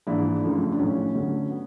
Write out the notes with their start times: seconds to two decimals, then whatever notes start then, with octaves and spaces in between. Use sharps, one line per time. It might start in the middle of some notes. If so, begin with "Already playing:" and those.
0.07 A#1 G#2 E3 D4 E4
0.42 F#2 C#3 F3 A3
0.72 D4
0.79 B1 A2 F3 C#4 D#4
1.15 D2 D3 F#3 A3
1.51 B3